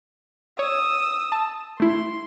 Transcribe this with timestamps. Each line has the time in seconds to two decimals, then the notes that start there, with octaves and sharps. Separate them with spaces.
0.59 C#5 D#6 E6
1.32 A5
1.80 A3 E4 C6